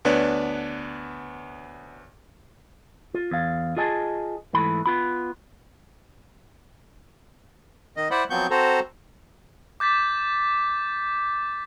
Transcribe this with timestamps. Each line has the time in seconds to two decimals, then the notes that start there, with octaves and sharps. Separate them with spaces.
0.05 D2 B3 D4 B4 C#5 D5
3.14 F4
3.31 E2 F5
3.77 F4 G#4 D#5 G#5 A5
4.53 G#2 E3 A3 B5
4.86 B3 F4 B5
7.97 D#3 D#5
8.11 E4 C5 D5 F#5 B5
8.30 F3 F#3 B3 C4 C#6 G6
8.50 C4 F#4 A4 C5 A#5
9.80 D6 G6 A6 B6